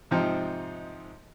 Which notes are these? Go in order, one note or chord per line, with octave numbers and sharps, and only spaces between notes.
G#2 C3 F3 C4 D#4